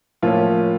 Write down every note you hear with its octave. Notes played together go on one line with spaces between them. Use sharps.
A2 F3 A#3 C#4 F4